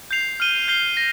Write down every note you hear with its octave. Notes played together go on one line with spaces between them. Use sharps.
G6 C7 F7
F6 D#7 G7
G6 C7 G7
A#6